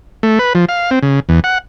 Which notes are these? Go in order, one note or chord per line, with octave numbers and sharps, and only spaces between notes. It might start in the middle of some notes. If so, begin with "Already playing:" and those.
A3
B4
F3
F5
C4
C#3
E2
F#5